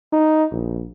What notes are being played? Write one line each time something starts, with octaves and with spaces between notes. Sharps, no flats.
D#4
A#1